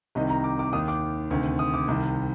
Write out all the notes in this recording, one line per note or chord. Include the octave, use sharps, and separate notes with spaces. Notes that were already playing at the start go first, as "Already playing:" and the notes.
C2 C3 D#3 D#5
A#5
D6
D6
D#2 D#3 D#6
D6
D2 C3 D#3
D#6
D6
C2 C3 D#3